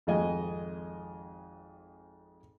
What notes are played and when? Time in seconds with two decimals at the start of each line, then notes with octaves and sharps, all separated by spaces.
0.07 G#1 F2 G#3 D#5 G#5